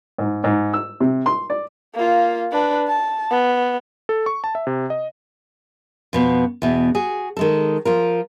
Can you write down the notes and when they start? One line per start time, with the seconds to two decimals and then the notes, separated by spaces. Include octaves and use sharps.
0.18 G#2
0.44 G#2
0.74 E6
1.00 C3
1.26 C6
1.50 D5
1.95 A#3 F4
2.52 D4 B4
2.88 A5
3.31 B3
4.09 A4
4.26 C#6
4.44 A5
4.55 E5
4.67 C3
4.90 D#5
6.13 F2 B2 B3
6.62 E2 B2
6.95 F#4 G#4
7.37 D#3 G#3 A4
7.85 F3 F4 A#4